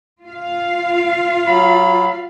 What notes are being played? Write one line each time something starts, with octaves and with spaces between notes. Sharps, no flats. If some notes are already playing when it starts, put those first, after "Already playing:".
F4 F5
F#3 B5